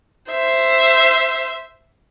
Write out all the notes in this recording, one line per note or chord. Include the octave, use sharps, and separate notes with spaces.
C5 E5